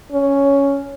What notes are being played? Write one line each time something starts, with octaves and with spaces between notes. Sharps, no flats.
C#4